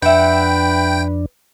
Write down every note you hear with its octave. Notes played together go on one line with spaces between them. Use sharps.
F2 D4 B4 E5 F#5 G5